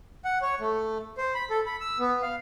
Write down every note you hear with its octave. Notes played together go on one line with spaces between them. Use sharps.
F#5
C#5
A3
C5
B5
A4
B5
E6
B3
F5